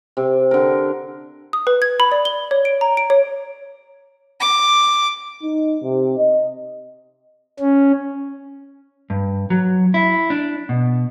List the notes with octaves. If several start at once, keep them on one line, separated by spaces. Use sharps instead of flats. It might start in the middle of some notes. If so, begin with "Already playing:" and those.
C3
D3 A#4
D#6
B4
G#6
B5
D5
G7
C#5
D7
A#5
D7
C#5
D6
D#4
C3
D#5
C#4
G2
F#3
E4
D4
B2